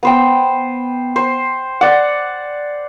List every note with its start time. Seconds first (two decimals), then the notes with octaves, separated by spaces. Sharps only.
0.03 B3 C5 G5
1.16 C5
1.81 D5 F#5